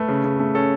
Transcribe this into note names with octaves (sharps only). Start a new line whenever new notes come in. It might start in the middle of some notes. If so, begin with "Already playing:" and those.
Already playing: A3 B4
C#3
C#3
A3
C#4 A4